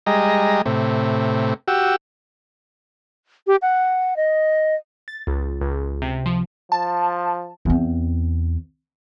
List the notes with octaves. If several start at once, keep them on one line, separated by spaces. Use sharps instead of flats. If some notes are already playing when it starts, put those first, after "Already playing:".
G3 G#3 D#5 A#5
A2 C3
F#4 G4 E6
G4
F#5
D#5
A6
C#2
C#2
C3
F3
F3 A5
E2 C4